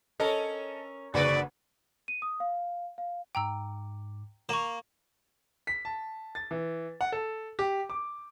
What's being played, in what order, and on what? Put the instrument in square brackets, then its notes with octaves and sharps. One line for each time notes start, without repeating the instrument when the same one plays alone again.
[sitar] C#4 A#4 [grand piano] A4 D#5
[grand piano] F#1 [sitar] D3 F#4 B4 [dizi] D5
[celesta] D#7
D#6
F5
F5
[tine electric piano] G#2 D6 [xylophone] G5 A#5 E6
[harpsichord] A#3 [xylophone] C#6 E7
[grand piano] B6
A5
A6
E3
F#5
A4
G4
D6